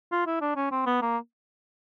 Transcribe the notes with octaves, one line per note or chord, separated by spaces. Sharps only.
F4
E4
D4
C#4
C4
B3
A#3